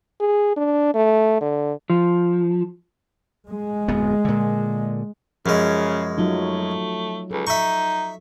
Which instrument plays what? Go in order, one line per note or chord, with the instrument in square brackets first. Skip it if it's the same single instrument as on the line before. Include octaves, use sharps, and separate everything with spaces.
[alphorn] G#4
D4
A3
D3
[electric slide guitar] F3
[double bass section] G#3
[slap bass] D1 F2 B3
A#2 D3
[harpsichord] F#2 G#3 [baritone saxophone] C#3 [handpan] F3
[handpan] F#3 D#4 F4 [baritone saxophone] A3
[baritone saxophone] C#2 [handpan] A4
[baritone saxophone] D#4 [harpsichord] E5 C#6